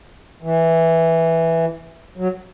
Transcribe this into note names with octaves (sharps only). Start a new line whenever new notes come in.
E3
F#3